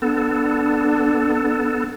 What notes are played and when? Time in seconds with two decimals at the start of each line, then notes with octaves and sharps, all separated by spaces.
0.02 B3 D4 A4